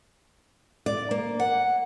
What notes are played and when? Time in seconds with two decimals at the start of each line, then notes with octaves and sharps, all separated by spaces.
0.86 D5
1.11 A#3
1.40 F#5